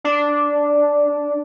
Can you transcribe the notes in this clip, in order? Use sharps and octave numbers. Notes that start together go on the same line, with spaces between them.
D4